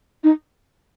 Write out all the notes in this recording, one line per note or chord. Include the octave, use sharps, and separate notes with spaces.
D#4